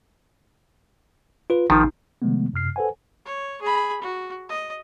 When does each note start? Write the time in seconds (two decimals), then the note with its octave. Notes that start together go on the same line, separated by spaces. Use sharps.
1.50 F4 B4
1.70 A1 D#3 F3 D#4
2.22 C3 D#3 F3 G#3 A3 B3
2.53 F#2 C3 F6 C7
2.76 A4 B4 C5 F#5 G#5
3.26 C#5
3.62 G#4 B5
4.02 F#4
4.49 D#5